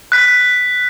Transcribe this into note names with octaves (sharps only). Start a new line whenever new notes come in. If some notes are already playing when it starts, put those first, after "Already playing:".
F#6 B6